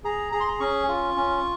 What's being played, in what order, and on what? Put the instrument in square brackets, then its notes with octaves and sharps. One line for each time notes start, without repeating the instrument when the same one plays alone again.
[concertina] G#4 A#5
G#4 A#5
C6
A#5
C#4 C#6
F4
C#4